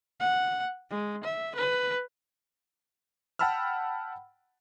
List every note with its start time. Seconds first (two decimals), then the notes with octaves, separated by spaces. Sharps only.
0.20 F#5
0.90 G#3
1.24 E5
1.55 B4
3.39 F#5 G5 A5 B5 E6 F6